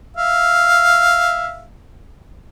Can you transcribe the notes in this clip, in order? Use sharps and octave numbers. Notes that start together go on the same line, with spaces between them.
E5 F5